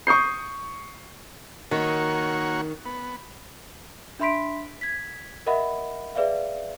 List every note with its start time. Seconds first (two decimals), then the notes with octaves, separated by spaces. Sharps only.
0.07 C#6 D#6 G6 C7
1.71 D#3 A#3 F#4 C#5
2.86 B3
4.19 D4 E5 B5 C6 B6 D7
4.81 G#6 B6
5.46 A#4 D#5 E5 F#5 B5
6.16 G#4 B4 D5 E5 F5